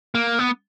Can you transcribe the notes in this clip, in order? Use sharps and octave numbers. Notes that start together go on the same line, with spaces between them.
A#3
B3